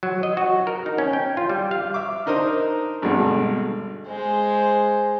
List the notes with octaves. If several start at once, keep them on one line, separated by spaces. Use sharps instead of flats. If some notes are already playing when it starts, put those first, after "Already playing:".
F#3
D#5
F#4
A#4
D#4
C#4
G5
F4
G3
F5
E5 D6
D4 D#4 A#4 C5 D#5
G#1 G2 B2 D3
G#3 C5